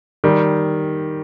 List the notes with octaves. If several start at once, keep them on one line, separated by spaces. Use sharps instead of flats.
D#3 G3